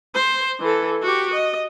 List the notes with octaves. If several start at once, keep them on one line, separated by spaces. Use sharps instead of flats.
C5
E3 A4
F#4 G4
D#5